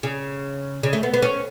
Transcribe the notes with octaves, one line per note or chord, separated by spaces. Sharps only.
C#3
C#3
A3
B3
B3
C#4